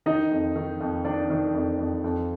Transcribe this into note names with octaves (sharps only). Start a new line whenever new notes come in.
D#3 D#4 D#5
F2
D#3
F2
D#3 D4 D5
D#3
F2
F2
F2